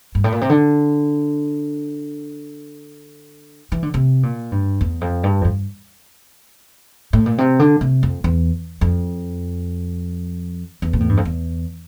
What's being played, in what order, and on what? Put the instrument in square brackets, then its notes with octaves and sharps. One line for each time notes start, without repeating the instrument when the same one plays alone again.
[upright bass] G2
A2
A#2
C3
D3
E3
D3
C3
A#2
G2
E2
F2
G2
F2
G2
A2
A#2
C3
D3
C3
F2
E2
F2
E2
A#2
A2
G2
F2
E2